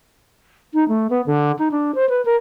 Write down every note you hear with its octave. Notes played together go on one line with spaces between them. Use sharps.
D#4
A3
B3
D3
D#4
D4
C5
B4
A#4